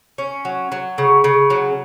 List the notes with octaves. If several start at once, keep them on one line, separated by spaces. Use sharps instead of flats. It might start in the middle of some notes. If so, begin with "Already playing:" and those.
C#4
F#3
F#3
C#3
C#3
F#3